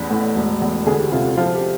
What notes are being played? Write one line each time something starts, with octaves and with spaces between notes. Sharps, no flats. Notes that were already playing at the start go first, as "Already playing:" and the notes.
Already playing: A1 E2 B4
A2
E1
E2
D2 G#4
G4
C3 F4
F#4
F3 F4
G4